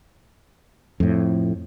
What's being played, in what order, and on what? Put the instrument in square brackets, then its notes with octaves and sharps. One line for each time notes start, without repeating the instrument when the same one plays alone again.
[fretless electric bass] F2 A2